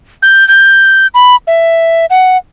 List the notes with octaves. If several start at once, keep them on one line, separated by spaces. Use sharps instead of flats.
G6
G6
B5
E5
F#5